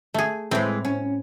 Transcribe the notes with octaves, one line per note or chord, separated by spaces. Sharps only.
A3 G#4
A2 E3 G#3 C4
C#4